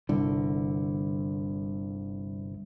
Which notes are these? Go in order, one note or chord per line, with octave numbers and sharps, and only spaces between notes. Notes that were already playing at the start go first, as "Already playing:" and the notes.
G1 C2 D3